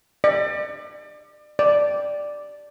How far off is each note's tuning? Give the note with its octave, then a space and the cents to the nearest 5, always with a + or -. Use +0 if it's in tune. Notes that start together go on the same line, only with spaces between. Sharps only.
D5 +35
D5 +0